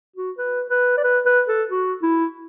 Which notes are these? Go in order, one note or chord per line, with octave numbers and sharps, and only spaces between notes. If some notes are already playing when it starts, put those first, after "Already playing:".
F#4
B4
B4
D5
B4
B4
A4
F#4
E4